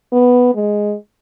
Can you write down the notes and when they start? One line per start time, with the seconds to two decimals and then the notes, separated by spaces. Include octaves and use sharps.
0.12 B3
0.55 G#3